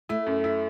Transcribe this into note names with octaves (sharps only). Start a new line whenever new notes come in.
A3 E4
F#2
E4